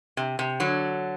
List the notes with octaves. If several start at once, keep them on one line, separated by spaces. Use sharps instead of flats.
C3
C3
D3 F#3